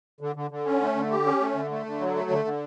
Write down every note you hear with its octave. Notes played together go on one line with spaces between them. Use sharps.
D3
D3
D3
C#4
A3
D3
G4
C#4
A3
D3
A3
D3
F#3
A3
D3
D3